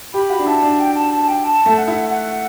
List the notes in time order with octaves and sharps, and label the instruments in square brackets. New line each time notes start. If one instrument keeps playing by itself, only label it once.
[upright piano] G4 [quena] B5
[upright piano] F#4
D4
[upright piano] E4 [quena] A5
[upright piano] D4
[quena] G5
A5
A5
G5
A5
[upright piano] A3
[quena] F#5
[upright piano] E4
[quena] F#5